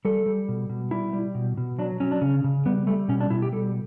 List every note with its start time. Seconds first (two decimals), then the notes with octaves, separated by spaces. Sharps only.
0.05 G3 A4
0.26 G3
0.49 B2
0.70 B2
0.91 G3 E4
1.13 G3
1.35 B2
1.57 B2
1.79 F#3 D4
2.00 F#3 C#4
2.11 D4
2.21 C#3 C#4
2.44 C#3
2.66 G3 B3
2.87 G3 A3
3.09 B2 C#4
3.21 D4
3.30 B2 E4
3.42 G4
3.52 G3 A4